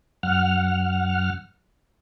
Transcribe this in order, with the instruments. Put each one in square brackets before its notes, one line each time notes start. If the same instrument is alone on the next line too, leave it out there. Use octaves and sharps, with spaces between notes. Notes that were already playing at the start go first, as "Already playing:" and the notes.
[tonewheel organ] F#2 F#5 F6